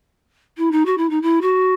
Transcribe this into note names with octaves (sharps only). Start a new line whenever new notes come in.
E4
D#4
F#4
E4
D#4
E4
F#4